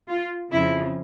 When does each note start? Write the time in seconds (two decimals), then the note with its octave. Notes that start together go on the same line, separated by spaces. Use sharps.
0.09 F4
0.52 F2 C#3 F3 E4